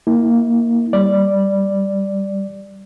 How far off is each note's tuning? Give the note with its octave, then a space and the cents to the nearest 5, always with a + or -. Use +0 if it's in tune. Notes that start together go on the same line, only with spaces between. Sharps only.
A#3 +0 E4 -35
G3 +0 D5 +0